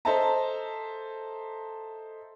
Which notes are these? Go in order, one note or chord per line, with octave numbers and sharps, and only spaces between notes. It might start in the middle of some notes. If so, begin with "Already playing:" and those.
A4 C5 D#5 E5 A5 A#5